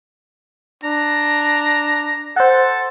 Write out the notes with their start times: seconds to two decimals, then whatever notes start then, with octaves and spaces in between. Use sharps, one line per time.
0.83 D4 A#5
2.36 A4 C5 F#5